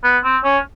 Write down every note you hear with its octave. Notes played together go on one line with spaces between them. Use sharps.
B3
C4
C#4